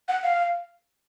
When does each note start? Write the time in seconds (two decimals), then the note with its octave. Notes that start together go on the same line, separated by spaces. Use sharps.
0.08 F#5
0.23 F5